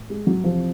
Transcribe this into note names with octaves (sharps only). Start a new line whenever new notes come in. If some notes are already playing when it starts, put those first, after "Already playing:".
Already playing: A2
G#3
F#3
F2 C3 E3 F3